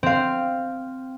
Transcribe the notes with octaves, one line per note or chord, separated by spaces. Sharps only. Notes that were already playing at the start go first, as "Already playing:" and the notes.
C4 F5